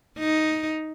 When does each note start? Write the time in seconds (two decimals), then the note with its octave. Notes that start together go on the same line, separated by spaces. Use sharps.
0.19 D#4